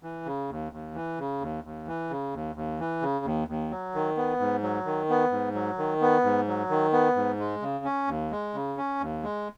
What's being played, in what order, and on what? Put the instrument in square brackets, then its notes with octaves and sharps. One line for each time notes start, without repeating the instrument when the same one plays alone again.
[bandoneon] E3
C#3
D#2
D#2
E3
C#3
D#2
D#2
E3
C#3
D#2
D#2
E3
C#3
D#2
D#2
F#3
D#3
B3
G#2
F#3
D#3
B3
G#2
F#3
D#3
B3
G#2
F#3
D#3
B3
G#2
G#3
C#3
C#4
D#2
G#3
C#3
C#4
D#2
G#3